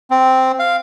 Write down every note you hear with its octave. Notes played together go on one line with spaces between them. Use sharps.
C4
F5